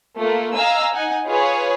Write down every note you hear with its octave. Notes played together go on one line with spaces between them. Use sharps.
A3 A#3 F4
D#5 F5 G#5 A#5 E6
D#4 F#5 G#5
F4 G#4 B4 C#5